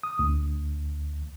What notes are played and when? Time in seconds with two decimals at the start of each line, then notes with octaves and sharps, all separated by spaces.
0.03 D#6
0.19 D2